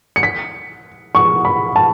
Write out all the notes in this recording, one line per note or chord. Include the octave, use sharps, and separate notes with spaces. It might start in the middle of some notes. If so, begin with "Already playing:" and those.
C#7
B6
C#6
B5
A5